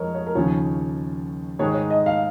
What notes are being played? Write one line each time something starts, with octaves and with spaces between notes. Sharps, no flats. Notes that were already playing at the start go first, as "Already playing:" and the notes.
Already playing: F2 G#3 A#4 C#5 D#5
C#5
A#4
D#2 C#3 F3 C#5
G#2 D#3 G#3 C#5
C#5
D#5
F5